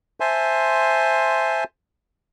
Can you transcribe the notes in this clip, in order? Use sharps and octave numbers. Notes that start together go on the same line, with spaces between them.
C5 E5 G#5 A5 C6